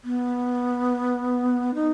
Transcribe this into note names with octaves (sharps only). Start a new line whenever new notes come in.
B3
D#4